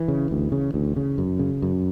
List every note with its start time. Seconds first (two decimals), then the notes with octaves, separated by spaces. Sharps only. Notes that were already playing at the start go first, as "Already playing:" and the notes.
Already playing: E3
0.08 C#3
0.31 D2
0.52 C#3
0.74 D2
0.96 C#3
1.18 F#2
1.39 C#3
1.62 F#2